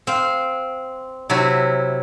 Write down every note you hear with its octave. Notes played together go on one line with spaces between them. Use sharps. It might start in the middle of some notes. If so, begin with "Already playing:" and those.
C4 F5
C3 F#3 E4 F#4